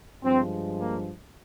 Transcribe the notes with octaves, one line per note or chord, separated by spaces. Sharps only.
G2 F3 G#3 C4
A#3